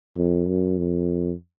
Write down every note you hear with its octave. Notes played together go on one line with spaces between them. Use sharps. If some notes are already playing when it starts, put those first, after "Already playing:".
F2
F#2
F2